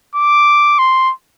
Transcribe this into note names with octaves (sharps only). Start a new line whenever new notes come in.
D6
C6